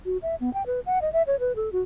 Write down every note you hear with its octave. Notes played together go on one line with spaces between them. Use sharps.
F#4
E5
B3
G5
B4
F#5
D#5
E5
C#5
B4
A4
F#4